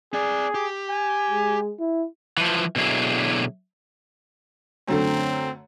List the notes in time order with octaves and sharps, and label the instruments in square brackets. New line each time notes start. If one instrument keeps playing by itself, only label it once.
[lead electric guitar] C4 D5 [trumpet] G#4
[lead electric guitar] G4
[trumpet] G#5
[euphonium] G#3
E4
[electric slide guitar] E3 F3
B2 D3 F#3 E4 G#4
[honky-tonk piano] F#2 D3 A3 [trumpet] C4